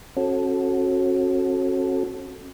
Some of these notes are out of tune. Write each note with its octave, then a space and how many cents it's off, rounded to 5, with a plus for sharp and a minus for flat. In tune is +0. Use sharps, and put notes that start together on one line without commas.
C#4 -40 F#4 -10 A4 -10